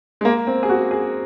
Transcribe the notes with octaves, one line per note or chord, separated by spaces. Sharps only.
G#3
A#3
C4
G#4
F#4
G#4